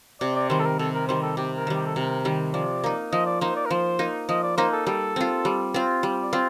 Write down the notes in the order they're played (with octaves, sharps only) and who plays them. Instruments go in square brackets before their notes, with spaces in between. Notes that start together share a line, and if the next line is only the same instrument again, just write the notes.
[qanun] C3 [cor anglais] D5
[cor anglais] D5
[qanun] D#3 G3 [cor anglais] C5
[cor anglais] A4
A#4
[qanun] C3 [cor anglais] A4
[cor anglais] A#4
[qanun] D#3 G3 [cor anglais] C5
[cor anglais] A4
[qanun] C3 [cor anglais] G4
[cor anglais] A#4
[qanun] D#3 G3
[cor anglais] G4
A4
[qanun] C3 [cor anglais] A#4
[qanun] D#3 G3
[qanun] F3 [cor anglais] D5
[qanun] A#3 D#4
[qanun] F3 [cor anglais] D#5
[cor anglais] D5
[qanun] A#3 D#4 [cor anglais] C5
[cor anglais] D5
A#4
[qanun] F3 [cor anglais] C5
[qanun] A#3 D#4
[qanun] F3 [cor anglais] D#5
[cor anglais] D5
[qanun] A#3 D#4 [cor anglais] C5
[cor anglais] A4
[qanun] G3 [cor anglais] A4
[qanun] C4 F4
G3
C4 F4
[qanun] G3 [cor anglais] C5
[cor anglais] D5
[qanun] C4 F4